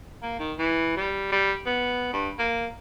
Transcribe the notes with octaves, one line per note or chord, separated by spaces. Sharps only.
A#3
D#3
E3
G3
G3
B3
G2
A#3